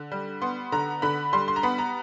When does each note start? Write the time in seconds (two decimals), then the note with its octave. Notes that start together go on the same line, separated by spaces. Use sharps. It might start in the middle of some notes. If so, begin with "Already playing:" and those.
Already playing: D3
0.12 G3
0.42 B3 C6
0.72 D3 A#5
1.02 D3 B5
1.33 G3 C6
1.48 C6
1.56 A#5
1.63 B3 B5
1.78 A#5